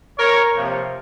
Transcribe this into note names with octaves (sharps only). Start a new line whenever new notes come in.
A#4 C#5
C3 F3 A#3